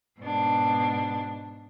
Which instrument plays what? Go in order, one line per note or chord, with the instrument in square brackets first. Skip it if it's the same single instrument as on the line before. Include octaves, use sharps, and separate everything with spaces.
[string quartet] G#2 B2 D4